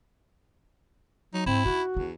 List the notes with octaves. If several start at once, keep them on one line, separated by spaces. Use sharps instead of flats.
F#3 D#4
G#2 C4 E4
C#4 D#4 F#4
E2 D4